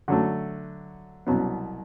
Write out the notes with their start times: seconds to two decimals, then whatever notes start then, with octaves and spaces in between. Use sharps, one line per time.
0.08 D3 F#3 A3
1.27 C2 B2 F#3 B3